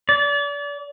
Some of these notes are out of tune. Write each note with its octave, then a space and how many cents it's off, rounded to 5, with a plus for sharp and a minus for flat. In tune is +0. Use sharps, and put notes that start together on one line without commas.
D5 -35